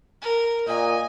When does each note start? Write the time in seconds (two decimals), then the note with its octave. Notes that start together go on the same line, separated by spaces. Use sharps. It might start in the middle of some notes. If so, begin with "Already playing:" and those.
0.22 A#4
0.67 A#2 D#5 G#5